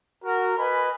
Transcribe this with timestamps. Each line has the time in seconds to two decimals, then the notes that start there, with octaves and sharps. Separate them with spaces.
0.24 F#4 A#4
0.59 B4 D#5 G#5 B5